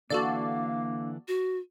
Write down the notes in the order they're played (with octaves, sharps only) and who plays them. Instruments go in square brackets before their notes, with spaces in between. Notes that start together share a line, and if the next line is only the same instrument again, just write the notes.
[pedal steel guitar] D3 E3 D4 [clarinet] A#3 [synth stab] F#4 A4 D5 [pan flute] F5
[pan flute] F#4